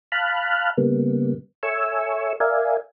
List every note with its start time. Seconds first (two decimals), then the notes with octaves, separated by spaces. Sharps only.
0.12 F5 A5 B5 F6 F#6
0.78 C#3 G3 A#3 B3
1.63 A4 C#5 E5 G#5 C#6 E6
2.40 A#4 D5 E5 F5 G#5